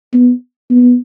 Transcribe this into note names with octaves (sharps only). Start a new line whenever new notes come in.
B3
B3